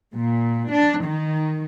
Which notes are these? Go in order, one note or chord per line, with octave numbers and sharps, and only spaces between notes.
A#2
D4
D#3